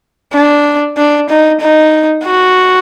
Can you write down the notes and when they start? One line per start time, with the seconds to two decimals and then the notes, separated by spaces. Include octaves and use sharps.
0.34 D4
0.98 D4
1.30 D#4
1.61 D#4
2.25 F#4